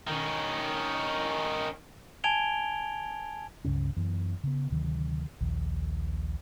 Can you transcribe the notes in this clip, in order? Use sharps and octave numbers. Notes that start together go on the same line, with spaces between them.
D#3 C#4
G#5 A5 G#6 D7 F7 G7
C#2 G2 C#3 C#4
F#2 E3 B3
C#3 B3
D2 C3 D#3 F#3
A#1 D#2